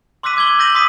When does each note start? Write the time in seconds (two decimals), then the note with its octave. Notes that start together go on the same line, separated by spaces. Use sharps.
0.23 C6 D6 E6 F#6 B6 D#7
0.37 D6 G#6 F#7 G7
0.59 E6 G6 A#6 D#7 F#7
0.75 C6 D#6 B6 D#7